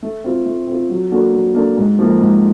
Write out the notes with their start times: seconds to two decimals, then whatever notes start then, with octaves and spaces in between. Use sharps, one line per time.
0.03 A3
0.24 C4 F4
0.46 A3
0.67 C4 F4
0.89 F#3
1.11 A#3 D4 F#4 A4
1.34 F#3
1.55 A#3 D4 F#4 A4
1.77 G#2
1.99 F3 A#3
2.20 G#2